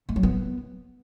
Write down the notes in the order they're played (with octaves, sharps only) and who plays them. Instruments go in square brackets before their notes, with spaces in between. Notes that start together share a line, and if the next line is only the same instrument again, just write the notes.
[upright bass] A3
F#3
B3